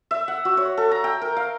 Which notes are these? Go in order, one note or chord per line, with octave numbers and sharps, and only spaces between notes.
E5
F#5
F#4
C#5
A4
A#5
G5
A#4
F5